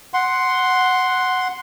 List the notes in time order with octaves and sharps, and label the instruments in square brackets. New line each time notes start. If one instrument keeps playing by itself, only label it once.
[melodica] F#5 C6